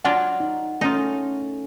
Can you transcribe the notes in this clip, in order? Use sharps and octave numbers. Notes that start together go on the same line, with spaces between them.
F#3 D4 F4 F#5
D#4
A3 C#4 D#4 F4